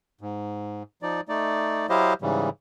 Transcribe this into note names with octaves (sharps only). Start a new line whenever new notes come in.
G#2
F3 D#4 D5
A3 D#4 D5
F#3 E4 G4 C5 D#5 F5
G#2 C#3 E3 G3